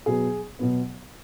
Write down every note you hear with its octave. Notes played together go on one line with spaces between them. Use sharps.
B2 F#3 B3 G#4
B2 F#3 B3